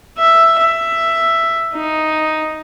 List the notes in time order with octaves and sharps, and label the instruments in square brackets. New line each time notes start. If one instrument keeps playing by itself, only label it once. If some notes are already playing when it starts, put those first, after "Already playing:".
[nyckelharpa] E5
E5
D#4